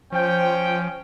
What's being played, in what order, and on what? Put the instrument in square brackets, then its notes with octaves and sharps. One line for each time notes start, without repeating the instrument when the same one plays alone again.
[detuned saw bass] F3 [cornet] C#4 [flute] C5 [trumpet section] G5